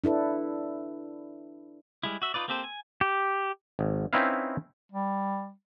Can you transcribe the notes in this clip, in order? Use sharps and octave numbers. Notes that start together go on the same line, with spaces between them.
D4 E4 A4 B4
G3 G#3 E4
F#4 E5
D#4 F4 B4 D5
A#3 C4 G4 A4 C5
G#5
G4
G#1
C4 C#4 D#4 E4 B4 F5
G3